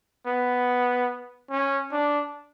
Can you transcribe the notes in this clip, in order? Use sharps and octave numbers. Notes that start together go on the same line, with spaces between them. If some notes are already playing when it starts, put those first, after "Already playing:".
B3
C#4
D4